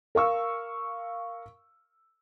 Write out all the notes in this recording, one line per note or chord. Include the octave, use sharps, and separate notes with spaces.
A#4 F5 C#6 E6